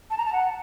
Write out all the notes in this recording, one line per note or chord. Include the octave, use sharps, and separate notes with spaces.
A5
A#5
A5
F#5